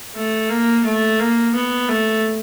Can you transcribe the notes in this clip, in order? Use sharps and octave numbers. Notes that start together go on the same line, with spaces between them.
A3
A#3
A3
A#3
B3
A3